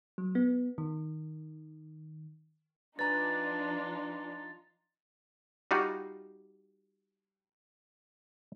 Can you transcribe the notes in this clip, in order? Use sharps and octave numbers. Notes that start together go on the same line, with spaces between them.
F#3
B3
D#3
F3 D4 D#4 F4 B4 G#5 A#5 A6
G3 D#4 F4 F#4